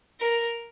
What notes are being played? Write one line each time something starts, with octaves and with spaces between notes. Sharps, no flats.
A#4